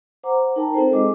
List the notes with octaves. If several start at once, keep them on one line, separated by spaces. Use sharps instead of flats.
C5 F#5 A#5 D6
D#4 A#4 G5 A5 A#5
C4 D#4 F4 A4 A#4 C5
G#3 G#4 D#5 D6